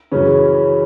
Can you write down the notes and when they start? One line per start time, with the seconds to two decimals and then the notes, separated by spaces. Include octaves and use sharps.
0.11 F#2 C#3 E3 C#4